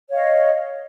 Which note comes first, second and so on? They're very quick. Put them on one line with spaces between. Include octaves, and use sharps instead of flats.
C#5 F5 D#5